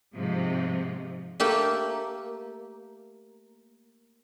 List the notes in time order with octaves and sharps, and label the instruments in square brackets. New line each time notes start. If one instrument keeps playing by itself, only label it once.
[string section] G#2 C3 F3
[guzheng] A3 A#3 G4 E5